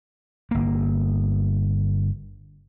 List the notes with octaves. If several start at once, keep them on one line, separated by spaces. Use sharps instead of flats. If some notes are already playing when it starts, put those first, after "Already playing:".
G1 A#3